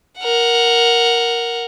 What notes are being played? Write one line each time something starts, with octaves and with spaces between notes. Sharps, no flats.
A#4 F#5